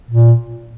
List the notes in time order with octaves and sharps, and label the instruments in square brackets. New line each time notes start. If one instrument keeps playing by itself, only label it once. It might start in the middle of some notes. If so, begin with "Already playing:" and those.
[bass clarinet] A#2